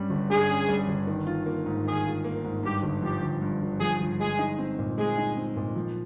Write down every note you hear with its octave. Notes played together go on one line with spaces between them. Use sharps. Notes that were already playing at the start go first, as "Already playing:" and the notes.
Already playing: G2 G3 C#4
G1
G2 G#4
C#4
G3
G1
D#3
F4
A#3
G#2
D#3 G#4
F4
A#3
G#2
G2 G4
G1
F3 G4
G1
G2
G1
F3 G#4
G1
G#3 G#4
D#4
C4
A#2
G#3 G#4
D#4
C4
A#2
F3